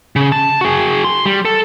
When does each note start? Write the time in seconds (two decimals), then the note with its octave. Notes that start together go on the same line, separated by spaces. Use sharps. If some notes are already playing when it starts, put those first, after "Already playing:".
0.16 C#3
0.32 A5
0.61 F#4 G#4
1.04 C6
1.26 G3
1.45 A4